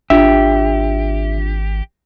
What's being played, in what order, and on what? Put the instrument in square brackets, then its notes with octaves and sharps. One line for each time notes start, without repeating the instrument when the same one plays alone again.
[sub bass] G#1 [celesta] D4 F4 [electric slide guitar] G4 [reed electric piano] E5